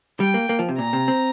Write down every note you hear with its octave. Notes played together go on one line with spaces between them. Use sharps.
G3 G5
A#3
A#3
F3
C3
A#2 A#5
C3
C4